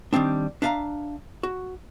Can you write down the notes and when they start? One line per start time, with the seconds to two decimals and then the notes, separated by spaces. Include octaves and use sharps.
0.13 D#3 G3 A3 C4 D4
0.62 D4 E5 F5 G#5 A#5
1.43 F#4